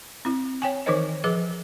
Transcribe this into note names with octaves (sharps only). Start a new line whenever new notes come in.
C4 E4
C#5 G5 G#5
D#3 E3 D#4 A#4 C5 D#5
F3 G#4 B4 D6